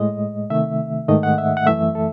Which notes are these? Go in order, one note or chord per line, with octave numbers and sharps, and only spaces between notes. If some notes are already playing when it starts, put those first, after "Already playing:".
Already playing: A2 G#3 D#5
C3 D#3 A3 E5
G#2 D#3 A3 D#5
F#5
E5
F#5
F#2 E3 A3 E5
A4